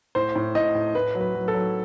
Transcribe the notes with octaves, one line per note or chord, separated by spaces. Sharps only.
A2 C5
A2
A2 D#5
A2
A2 B4
F#3
B4
F#3
A4
F#3